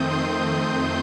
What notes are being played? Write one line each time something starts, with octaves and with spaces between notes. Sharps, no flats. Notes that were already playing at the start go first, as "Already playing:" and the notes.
Already playing: F2 D#3 A3 C4 D#6 G6
C6 D#6